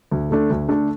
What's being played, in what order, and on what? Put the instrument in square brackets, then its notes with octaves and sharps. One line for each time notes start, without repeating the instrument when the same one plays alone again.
[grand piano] D2
D3 A3 D4 A4
D2
D3 A3 D4 A4